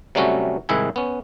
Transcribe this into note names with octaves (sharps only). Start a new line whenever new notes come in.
C3 F#3 G3 A3 C#4 F#4
C2 G#2 D#3 E4 E5 G#5
B3 C#4